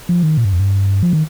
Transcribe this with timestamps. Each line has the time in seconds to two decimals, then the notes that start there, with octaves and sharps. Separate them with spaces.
0.09 F3
0.23 D#3
0.38 A#2
0.45 G2
0.53 F2
0.59 G2
1.03 F3
1.13 D#3